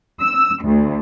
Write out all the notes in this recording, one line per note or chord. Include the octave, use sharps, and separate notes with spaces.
E6
D2